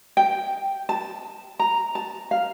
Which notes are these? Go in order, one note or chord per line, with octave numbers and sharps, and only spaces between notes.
G5
A5
A#5
A5
F5